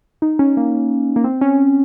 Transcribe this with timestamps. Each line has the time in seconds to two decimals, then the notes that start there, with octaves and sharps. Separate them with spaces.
0.22 D#4
0.39 C#4
0.57 A#3
1.16 A#3
1.24 C4
1.41 C#4